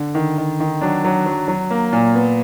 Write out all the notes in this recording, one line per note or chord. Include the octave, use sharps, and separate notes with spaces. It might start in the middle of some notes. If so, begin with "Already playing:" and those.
Already playing: D3
D#3
D#3
D#3
F#3 D4
F#3
F#3
F#3
A#3
A#2
B3